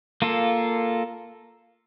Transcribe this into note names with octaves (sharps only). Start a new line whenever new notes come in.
A#3 F4 A4